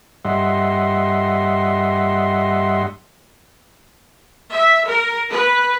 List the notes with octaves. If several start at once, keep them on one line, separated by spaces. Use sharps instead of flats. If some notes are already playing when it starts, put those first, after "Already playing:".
G2 G3 D#5 E5 F#5 C6
E5
A#4
B4